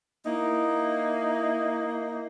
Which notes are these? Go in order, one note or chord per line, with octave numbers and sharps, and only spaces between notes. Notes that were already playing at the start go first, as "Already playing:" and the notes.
A#3 D#4 E4